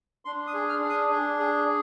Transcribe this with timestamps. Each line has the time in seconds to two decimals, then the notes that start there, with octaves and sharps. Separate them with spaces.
0.25 D4 C6
0.47 D#6
0.53 G#4
0.69 F6
0.83 D4
0.89 D#6
1.11 D4
1.39 G#4